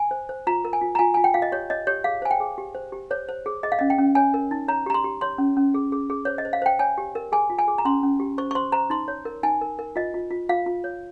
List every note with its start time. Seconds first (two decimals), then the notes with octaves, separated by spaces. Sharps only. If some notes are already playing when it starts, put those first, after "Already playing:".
Already playing: G#5
0.11 C5
0.29 C5
0.47 F4 A#5
0.65 A#4
0.73 G#5
0.81 F4
0.95 A#5
0.99 F4 G#5
1.14 F4 G#5
1.24 G5
1.34 F4 F5
1.42 D#5
1.52 G4 C#5
1.70 C#5 D#5
1.87 G4 C#5
2.04 G#4 F5
2.22 C5 G#5
2.31 G5
2.40 G#4
2.58 G4
2.75 C5
2.92 G4
3.11 C5 C#5
3.29 C5
3.46 G#4
3.63 G#4 D#5
3.72 F5
3.79 C#4 D#5
3.90 G5
3.99 C#4
4.15 C#5 G#5
4.34 A#4
4.51 D#4
4.68 C#5 A#5
4.86 G4 A#5
4.94 C6
5.04 G4
5.21 C#5 C6
5.38 C#4
5.57 C#4
5.74 G#4
5.92 G#4
6.10 G#4
6.25 C5 C#5
6.38 D#5
6.45 C5
6.53 F5
6.62 C5 G5
6.79 C#5 G#5
6.98 G4
7.15 A#4
7.32 G#4 G#5
7.50 F4
7.59 G#5
7.68 G#4
7.78 A#5
7.85 C#4 C6
8.03 C#4
8.20 G4
8.38 C5 C#6
8.51 C#6
8.55 C5 C6
8.72 C5 A#5
8.90 D#4 C6
9.08 C#5
9.25 A#4
9.43 D#4 G#5
9.61 A#4
9.79 A#4
9.96 F4 D#5
10.14 F4
10.31 F4
10.49 F4 F5
10.66 F4
10.84 C#5